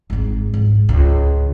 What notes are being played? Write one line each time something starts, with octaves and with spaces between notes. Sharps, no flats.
G#1 G#2
C#2 G#2
C#2 C#3